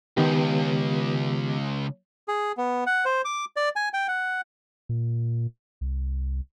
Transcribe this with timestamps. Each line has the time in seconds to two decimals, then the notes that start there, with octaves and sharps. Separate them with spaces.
0.17 C#2 D#3 B3 G4
2.28 G#4
2.57 B3
2.86 F#5
3.05 C5
3.25 D6
3.56 D5
3.76 G#5
3.94 G5
4.08 F#5
4.89 A#2
5.81 C2